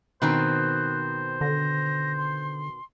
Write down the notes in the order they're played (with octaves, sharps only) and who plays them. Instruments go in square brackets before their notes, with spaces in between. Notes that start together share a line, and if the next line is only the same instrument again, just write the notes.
[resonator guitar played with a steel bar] B2 D#3 C4 [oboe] C5 [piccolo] F#6
[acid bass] D3 [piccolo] A#6
[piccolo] C6